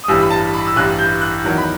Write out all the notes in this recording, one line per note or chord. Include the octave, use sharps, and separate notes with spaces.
D#6
A1 G2 E3 G3 E6
B5
A5
B5
E6
A1 G2 E3 G3 F#6
G6
F#6
E2 D#3 F#3
B5